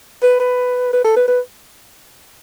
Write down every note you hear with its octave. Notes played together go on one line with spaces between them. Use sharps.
B4
B4
B4
A4
B4
B4